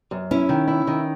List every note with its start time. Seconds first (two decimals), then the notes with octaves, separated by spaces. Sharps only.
0.11 F#2
0.31 C#4 E4
0.49 D#3
0.68 E4
0.87 D#3